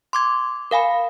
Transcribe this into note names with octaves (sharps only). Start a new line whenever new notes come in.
C6 D6 G#6
A#4 F5 G#5 B5